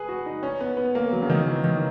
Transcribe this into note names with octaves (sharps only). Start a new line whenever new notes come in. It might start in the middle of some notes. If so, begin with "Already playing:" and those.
Already playing: G#4 B4
F#4
D#4
C#4
B3
B3
A#3
F#3
C#3
D#3
E3
D#3